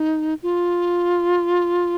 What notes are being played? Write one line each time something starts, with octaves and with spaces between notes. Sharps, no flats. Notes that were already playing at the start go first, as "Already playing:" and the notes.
Already playing: D#4
F4